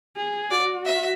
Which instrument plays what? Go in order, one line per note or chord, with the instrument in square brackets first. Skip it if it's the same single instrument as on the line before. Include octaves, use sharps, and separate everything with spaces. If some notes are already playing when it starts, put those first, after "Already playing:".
[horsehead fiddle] G#4
[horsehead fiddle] F#4 [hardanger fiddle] D5
[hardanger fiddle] E5